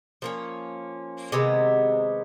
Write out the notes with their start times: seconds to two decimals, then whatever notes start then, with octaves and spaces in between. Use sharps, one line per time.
0.22 F3 A#3 C#4
1.32 C3 D#3 G#3 B3